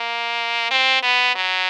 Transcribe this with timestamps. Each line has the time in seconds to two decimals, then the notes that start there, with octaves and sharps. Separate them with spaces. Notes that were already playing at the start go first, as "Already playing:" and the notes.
Already playing: A#3
0.71 C4
1.03 B3
1.35 F#3